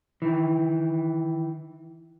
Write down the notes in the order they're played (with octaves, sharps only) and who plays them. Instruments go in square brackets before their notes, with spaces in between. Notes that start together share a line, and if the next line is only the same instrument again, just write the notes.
[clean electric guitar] D#3 E3